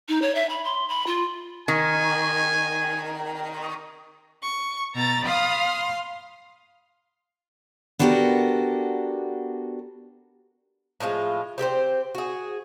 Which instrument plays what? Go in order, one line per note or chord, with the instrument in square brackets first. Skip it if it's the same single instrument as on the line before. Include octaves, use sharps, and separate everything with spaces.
[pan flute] D#4
C#5
E5
B5
C6
B5
F4
[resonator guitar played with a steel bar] D#3 [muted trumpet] G#5
[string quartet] C#6
[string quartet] B2 E6 [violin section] A#5 A6
[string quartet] F5 C6 F6 [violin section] B5 D#6
[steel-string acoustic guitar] B3 D4 F#4 G4 A4 A#4
[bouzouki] A2 F3 G#3 F4
C4 G4 A4 C5
F#4 G#4